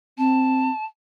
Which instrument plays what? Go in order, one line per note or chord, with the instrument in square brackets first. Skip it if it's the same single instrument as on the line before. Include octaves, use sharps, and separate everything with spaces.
[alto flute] C4 [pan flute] A5